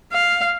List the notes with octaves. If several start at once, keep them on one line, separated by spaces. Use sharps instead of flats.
F5